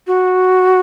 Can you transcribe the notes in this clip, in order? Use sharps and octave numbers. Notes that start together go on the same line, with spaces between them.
F#4